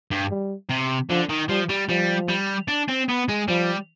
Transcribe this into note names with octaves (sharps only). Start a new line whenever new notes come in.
G2
G3
C3
D3 F3
D#3
F3 G3
G3
F3 G3
G3
D4
C4
B3
G#3
F3 G3